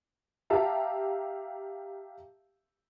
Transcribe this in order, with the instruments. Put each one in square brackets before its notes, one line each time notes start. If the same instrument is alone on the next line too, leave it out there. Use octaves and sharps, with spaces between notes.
[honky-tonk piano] G4 E5 F5 A5 A#5